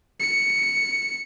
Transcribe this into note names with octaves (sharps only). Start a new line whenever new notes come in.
C#7